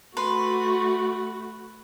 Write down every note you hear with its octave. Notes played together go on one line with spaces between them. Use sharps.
A3 F#4 B4 C6